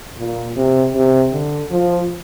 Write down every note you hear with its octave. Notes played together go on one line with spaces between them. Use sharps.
A#2
C3
C3
D3
F3